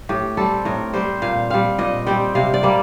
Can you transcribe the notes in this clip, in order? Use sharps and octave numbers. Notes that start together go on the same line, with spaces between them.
A2 G4
G3 C4 A4
A2 A#4
G3 C4 C5
A#2 F5
G3 C4 F5
A#2 D#5
G3 C4 G5
C3 F5
D5
G3 A#3